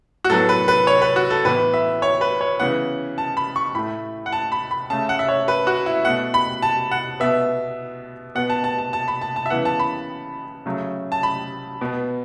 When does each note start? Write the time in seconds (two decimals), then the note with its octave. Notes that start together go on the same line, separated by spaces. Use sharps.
0.25 F#4
0.30 A2 F#3 B3 A4
0.49 B4
0.68 B4
0.87 C#5
1.02 B4
1.16 F#4
1.30 A4
1.45 A2 E3 B3 B4
1.74 E5
2.02 C#5
2.21 B4
2.41 C#5
2.60 C#3 E3 B3 F#5
3.18 A5
3.37 B5
3.56 C#6
3.75 A2 A3 B5
4.26 F#5
4.32 A5
4.52 B5
4.71 B5
4.90 C#3 A3 A5
5.09 F#5
5.19 E5
5.28 C#5
5.48 B4
5.67 F#4
5.86 E4
6.05 B2 A3 F#5
6.34 B5
6.62 A5
6.91 F#5
7.20 B2 B3 E5
8.35 B2 B3 F#5
8.50 A5
8.64 A5
8.78 A5
8.93 A5
9.08 B5
9.21 A5
9.36 A5
9.46 E5
9.50 C#3 E3 B3 F#5
9.65 A5
9.79 B5
10.66 C#3 F#3 A3
11.12 A5
11.23 B5
11.81 B2 B3